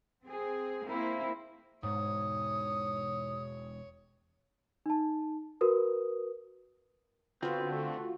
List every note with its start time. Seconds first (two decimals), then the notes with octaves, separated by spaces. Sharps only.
0.24 C4 G#4
0.84 A#3 C4 E4
1.83 E1 G#2 G#3 C#5 D#6
4.86 D#4 A5
5.61 F#4 A#4 B4 D#6
7.42 D3 B3 C4 F4 F#4
7.71 A3